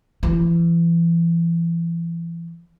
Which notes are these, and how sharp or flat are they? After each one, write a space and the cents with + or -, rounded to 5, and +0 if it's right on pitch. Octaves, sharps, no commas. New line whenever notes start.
E3 +35